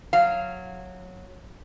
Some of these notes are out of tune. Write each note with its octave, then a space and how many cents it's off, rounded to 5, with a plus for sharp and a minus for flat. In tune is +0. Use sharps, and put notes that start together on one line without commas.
F#3 -15 F5 -15